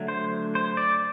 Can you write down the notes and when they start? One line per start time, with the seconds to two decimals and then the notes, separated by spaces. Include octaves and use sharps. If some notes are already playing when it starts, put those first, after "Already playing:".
Already playing: D3 F#3 A3
0.08 C5
0.55 C5
0.77 D5